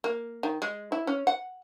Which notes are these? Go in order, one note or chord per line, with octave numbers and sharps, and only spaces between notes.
A#3
D#3
G#3
E4
C#4
F#5